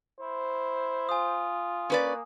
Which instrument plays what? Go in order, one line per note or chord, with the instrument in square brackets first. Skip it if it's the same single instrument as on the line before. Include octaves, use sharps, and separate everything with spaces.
[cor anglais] E4 [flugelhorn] C5
[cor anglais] F4 [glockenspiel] G#5 D#6
[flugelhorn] A#3 [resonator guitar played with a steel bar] C#4 B4 D5